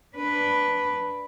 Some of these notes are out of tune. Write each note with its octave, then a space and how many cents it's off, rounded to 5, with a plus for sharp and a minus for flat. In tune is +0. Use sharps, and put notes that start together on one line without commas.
D4 +0 B4 +0